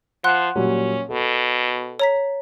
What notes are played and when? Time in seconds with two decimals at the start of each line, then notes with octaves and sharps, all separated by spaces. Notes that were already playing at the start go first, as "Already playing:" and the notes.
0.24 F3 F#5 C6 F#6
0.56 A#2 F#3 G3 C#4
1.09 B2 A4
2.00 C#5 A#5 B6